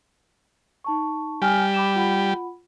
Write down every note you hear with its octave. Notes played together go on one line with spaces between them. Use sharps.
D#4 A5 C#6
G3 G#5 F6
B5 D6 E7
F4 F#5 B5